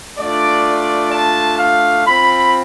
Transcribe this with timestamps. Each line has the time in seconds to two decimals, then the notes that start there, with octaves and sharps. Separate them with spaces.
0.18 A3 D4 F4 D5
1.12 A5
1.59 F5
2.06 C4 F4 B5